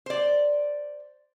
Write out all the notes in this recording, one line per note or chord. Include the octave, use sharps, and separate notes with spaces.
C5 D5